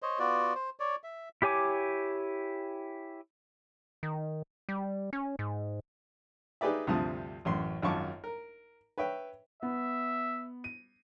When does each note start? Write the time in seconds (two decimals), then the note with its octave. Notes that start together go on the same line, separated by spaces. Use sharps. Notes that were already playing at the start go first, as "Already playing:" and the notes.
0.02 C5 C#5 D#5
0.19 B3 F4 F#4 D5
0.55 C5
0.80 C#5 D5
1.04 E5
1.42 E4 G4 C#5 G#5 D6
4.03 D#3
4.69 G3
5.13 C#4
5.39 G#2
6.61 D#4 G4 G#4 B4 D5 E5
6.87 D2 G2 C3 F3 A5 D#6
7.45 A1 F#2 C6
7.82 G#1 F#2 F4 A5 C#6 D6
8.24 A#4
8.98 B4 C#5 E5 G5
9.63 B3 E5
10.64 D#7